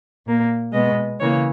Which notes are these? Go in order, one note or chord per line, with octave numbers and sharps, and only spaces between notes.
A#2 A#3
B2 G#3 B3 D#5
C#3 E3 A#3 C#5